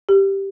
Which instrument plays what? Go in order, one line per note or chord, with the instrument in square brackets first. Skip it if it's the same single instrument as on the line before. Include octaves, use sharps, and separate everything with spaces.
[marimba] G4